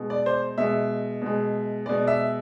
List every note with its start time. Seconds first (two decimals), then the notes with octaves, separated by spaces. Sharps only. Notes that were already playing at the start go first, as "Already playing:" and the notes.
Already playing: B2 G#3
0.10 D5
0.26 C5
0.58 B2 G#3 E5
1.22 B2 G#3
1.86 B2 G#3 D5
2.07 E5